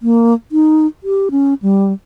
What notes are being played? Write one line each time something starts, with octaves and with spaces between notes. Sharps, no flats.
A#3
D#4
G4
C#4
G3